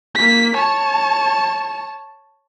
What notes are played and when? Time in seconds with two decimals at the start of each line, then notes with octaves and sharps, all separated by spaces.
0.16 A#3 B6
0.55 C#5 A5